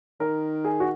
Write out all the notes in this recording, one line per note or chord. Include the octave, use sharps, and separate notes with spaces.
D#3 A#4
G#4
F#4